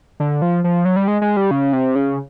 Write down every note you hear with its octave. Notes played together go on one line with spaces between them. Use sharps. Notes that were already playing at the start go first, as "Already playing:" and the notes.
D3
F3
F3
F#3
G3
G#3
G#3
G3
C#3
C3
C#3